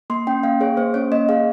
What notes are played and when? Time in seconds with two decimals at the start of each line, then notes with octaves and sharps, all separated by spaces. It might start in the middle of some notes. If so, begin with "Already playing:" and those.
0.10 A#3 C6
0.27 C#4 G5
0.43 A#3 F5
0.60 G#4 C#5
0.77 A#3 C5
0.94 C#4 C#5
1.12 A#3 D#5
1.29 G#4 F5